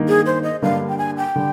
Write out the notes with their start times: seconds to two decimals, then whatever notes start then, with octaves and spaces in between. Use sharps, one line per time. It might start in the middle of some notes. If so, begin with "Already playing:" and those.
Already playing: G2 D#3 A#3 D#4
0.08 G#4
0.26 C5
0.44 D#5
0.62 G2 D3 G3 A#3 F5
0.89 G5
0.98 G#5
1.17 G5
1.36 D3 G3